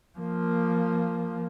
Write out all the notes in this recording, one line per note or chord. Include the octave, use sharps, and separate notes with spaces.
F3 A#3